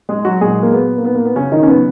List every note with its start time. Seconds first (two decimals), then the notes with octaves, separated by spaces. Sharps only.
0.09 G#3 G#4
0.25 F#3 F#4
0.41 A#2 F#3 G#3 G#4
0.63 A#3
0.73 B3
0.98 A#3
1.05 B3
1.15 A#3
1.25 B3
1.36 C#3 C#4
1.52 D#3 D#4
1.63 C#4
1.68 C#3 F#3 B3